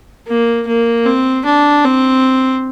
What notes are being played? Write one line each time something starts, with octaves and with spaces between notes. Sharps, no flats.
A#3
A#3
C4
D4
C4